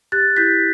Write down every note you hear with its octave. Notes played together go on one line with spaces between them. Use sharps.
G4 F#6 A6
E4 G6 B6